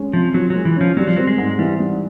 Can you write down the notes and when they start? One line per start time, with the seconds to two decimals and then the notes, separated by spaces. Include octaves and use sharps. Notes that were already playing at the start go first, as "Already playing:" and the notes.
Already playing: G#3 C#4
0.13 C3 F3
0.34 F3 F#3
0.50 F#3 G#3
0.65 E3
0.77 F3 C#4
0.97 F#3 G3
1.07 F3
1.17 F#3 C4
1.27 G#3
1.38 G#2
1.59 E3 G3
1.80 G3